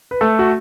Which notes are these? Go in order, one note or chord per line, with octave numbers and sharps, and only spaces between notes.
B4
A3 A4
F#4